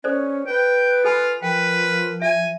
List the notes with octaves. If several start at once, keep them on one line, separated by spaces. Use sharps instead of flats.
C#4 A4 C5 D5
B4 G5
F4 A4 G#5 B5
F3 A#4 B4 G5
E5 G#5